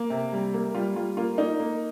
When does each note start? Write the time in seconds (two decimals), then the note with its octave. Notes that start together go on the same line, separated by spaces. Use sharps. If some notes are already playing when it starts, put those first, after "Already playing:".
Already playing: A#3
0.10 C3
0.33 G3
0.54 A#3
0.74 G3 F4
0.95 G3 F4
1.17 A#3 F4
1.38 A#3 D#4
1.60 A#3